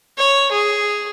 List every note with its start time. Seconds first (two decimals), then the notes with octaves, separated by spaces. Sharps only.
0.18 C#5
0.52 G#4